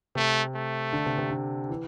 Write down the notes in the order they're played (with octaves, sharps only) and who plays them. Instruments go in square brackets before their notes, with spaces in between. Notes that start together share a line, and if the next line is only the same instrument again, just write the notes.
[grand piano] C3 [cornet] A3
[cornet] A3
[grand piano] D3
C3
C3
D3
E3